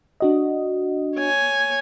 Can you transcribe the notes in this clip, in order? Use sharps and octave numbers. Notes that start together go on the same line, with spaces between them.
D4 F#4 D#5
C#5 G#5